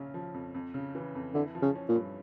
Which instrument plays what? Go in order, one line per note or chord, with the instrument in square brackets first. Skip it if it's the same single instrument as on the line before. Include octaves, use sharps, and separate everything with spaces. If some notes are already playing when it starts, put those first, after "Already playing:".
Already playing: [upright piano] A#1 C#3 C#4
F3
F2
F2
C#3
E3
F2
[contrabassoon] D3 [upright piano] E4
[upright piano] F3
[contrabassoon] C#3
[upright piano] C#4
[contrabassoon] A#2
[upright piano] G2